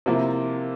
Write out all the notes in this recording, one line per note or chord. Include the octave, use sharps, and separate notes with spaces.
C3 F3 A#3 E4